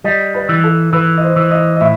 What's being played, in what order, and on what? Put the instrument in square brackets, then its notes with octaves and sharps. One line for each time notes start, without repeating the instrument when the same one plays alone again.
[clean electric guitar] G3 [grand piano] D#5
[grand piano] B4
[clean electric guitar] E3
[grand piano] A4
[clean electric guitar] E3 [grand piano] B4
[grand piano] D#5
C5
[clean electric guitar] E3
[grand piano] D#5
D#5
[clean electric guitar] A2 [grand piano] E5